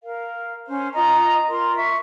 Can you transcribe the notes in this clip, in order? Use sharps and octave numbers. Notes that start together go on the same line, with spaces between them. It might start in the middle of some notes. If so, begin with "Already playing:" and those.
A#4 F5
C#4 C5
F4 D#5 A#5 D#6
F4 A#4 C6
E5 C#6